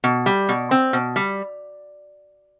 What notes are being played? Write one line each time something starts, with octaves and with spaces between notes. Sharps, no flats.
B2
G3
B2
C4
B2
G3